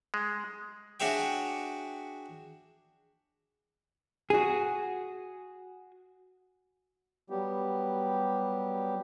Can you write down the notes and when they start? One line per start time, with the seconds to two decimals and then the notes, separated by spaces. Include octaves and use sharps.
0.14 G#3
1.00 D4 F#4 G#4 C#5 E5 G5
4.30 F#4 G#4
7.30 F#3 G3 B3 G4